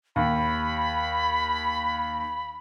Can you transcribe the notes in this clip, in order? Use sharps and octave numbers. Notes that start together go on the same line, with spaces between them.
D#2 B5